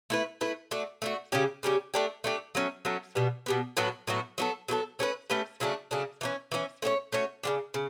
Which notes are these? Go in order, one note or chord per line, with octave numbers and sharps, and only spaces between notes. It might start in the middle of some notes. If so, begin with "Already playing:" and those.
A3 E4 B4
A3 E4 B4
A3 D4 F#4
A3 D4 F#4
C#3 G3 C#4 G4
C#3 G3 C#4 G4
A3 D4 G4
A3 D4 G4
F#3 A3 C#4
F#3 A3 C#4
B2 G3 B3
B2 G3 B3
A2 F#3 B3 F#4
A2 F#3 B3 F#4
F#3 B3 F#4 A4
F#3 B3 F#4 A4
A3 C#4 G4 B4
A3 C#4 G4 B4
C#3 F#3 A3 D4
C#3 F#3 A3 D4
E3 A3 C#4
E3 A3 C#4
A3 C#4 F#4 C#5
A3 C#4 F#4 C#5
C#3 G3 D4
C#3